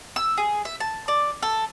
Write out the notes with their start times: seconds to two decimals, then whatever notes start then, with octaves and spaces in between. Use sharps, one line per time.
0.16 E6
0.37 G#4
0.65 E5
0.80 A5
1.08 D5
1.42 A4